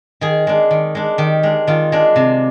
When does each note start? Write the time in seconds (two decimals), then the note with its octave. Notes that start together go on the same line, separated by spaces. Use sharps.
0.21 D#3 G#4
0.47 G#3 D4
0.71 D#3
0.95 G#3 D4
1.18 D#3 G4
1.43 G#3 D4
1.67 D#3 F4
1.92 G#3 D4
2.16 C3